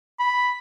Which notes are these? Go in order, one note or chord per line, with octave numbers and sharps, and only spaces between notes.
B5